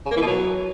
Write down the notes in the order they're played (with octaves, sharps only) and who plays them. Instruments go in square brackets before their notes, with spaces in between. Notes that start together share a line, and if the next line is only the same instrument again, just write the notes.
[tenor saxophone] C#3
A#3
E3
B2
F#3